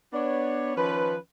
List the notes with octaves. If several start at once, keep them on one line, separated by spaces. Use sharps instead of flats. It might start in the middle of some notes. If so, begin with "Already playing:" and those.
B3 D4 C#5
D#3 F3 C#4 B4